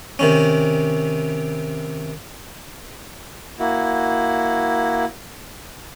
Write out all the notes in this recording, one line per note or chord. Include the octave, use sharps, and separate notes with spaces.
C3 D#3 C#4
A#3 E4 F#4